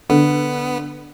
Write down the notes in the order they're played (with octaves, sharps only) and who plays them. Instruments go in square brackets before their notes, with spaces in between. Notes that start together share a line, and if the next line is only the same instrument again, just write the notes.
[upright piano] D3 [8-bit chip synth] B3